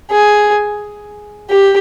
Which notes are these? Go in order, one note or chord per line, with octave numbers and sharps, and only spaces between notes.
G#4
G4